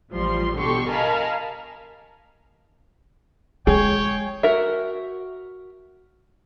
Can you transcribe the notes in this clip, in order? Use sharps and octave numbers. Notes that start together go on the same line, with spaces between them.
A1 F3 G3 C6
B2 D3 G4 A4 C6 C#6
A#4 D#5 F5 G#5 A5 B5
G#3 G#4 C#5 G5
F#4 A#4 E5